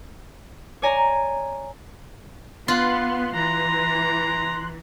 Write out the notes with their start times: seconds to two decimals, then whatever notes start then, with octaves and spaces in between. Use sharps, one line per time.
0.82 C#5 D5 G#5 A#5
2.68 B3 F4 C6 F#6
3.35 E3 A#5